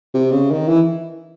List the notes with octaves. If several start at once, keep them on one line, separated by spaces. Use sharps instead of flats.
C3
C#3
D#3
E3